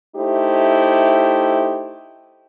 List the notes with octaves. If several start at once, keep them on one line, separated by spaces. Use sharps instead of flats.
A3 D#4 E4 G4 C5